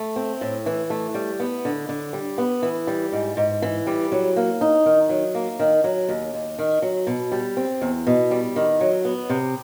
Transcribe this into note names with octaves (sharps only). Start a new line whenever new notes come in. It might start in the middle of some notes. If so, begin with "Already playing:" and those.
Already playing: A3
C4
A2
E3
A3
G3
B3
D3
D3
G3
B3
E3
G3
G#2
G#2
E3
G3
F#3
A#3
D#4
D#3
F#3
A#3
D#3
F#3
D#2
D#2
D#3
F#3
B2
G3
C4
E2
B2
G3
D#3
F#3
B3
C3